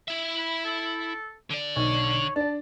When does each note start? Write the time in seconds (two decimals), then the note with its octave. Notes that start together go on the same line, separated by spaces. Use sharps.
0.08 E4 E5
0.38 B5
0.65 A4
1.51 D3 D5
1.76 B1 C#5
2.36 D4 D5 A5